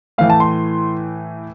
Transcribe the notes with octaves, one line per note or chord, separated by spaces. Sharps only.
A2 E3 A3 F5
A5
C6